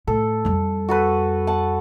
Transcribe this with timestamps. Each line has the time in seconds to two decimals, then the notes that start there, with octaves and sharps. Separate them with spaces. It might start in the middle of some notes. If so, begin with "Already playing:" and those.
0.07 A2 A4
0.45 F2 G3
0.89 F#4 A4 B4
1.47 F#5 A5